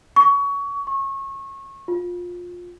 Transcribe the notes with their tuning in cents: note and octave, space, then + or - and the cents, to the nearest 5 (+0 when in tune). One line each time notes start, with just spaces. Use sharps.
C#6 +25
C#6 -25
F4 +20